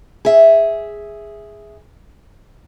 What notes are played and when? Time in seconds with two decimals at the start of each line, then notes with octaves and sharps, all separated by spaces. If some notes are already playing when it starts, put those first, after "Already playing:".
0.25 G#4 E5